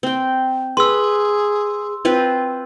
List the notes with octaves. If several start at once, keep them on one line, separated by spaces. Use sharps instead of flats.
C4 G5
G#4 B4 C6 E6
C4 F4 B4